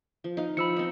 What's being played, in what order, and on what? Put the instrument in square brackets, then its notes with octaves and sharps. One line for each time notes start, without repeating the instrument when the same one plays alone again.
[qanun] F3
D#4 F5
[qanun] F3 [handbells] B5 E6 C#7
[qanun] C4 D#4